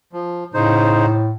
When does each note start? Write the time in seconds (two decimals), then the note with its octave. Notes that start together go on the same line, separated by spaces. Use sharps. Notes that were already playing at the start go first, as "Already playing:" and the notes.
0.13 F3
0.54 A2 C#3 D#4 C5